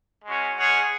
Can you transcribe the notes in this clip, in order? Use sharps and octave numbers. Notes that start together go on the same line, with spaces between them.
G#3 C#4 F#4
G#3 C#4 G#4 C#5 F#5